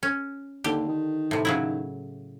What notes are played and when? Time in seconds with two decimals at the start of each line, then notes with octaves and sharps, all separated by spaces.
0.03 C#4
0.64 D#2 D3 G4
0.89 D#3
1.31 A2 C3
1.45 C#3 F#3 E4